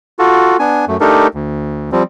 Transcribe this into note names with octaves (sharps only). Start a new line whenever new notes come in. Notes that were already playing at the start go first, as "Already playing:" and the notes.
F4 F#4 A4
B3 D4 G#5
F#2 A3
A3 D4 D#4 G4 A4 A#4
D2
F3 G3 C4